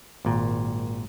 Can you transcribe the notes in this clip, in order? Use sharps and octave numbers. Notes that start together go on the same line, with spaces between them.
G#1 A#2